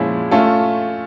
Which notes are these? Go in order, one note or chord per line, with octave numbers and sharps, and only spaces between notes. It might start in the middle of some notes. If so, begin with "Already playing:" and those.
Already playing: A#2 F3 G#3 C#4 E4
A3 C#4 F4 A4